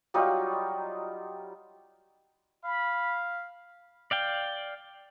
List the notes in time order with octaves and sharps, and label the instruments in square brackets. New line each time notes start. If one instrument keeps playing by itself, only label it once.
[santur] F#3 G3 D#4 F4
[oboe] F5 [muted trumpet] B5
[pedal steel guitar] D5 F5 G5